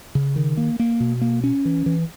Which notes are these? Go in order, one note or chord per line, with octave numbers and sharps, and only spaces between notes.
C#3
D#3
A#3
A#3
B2
A#3
C#4
E3
E3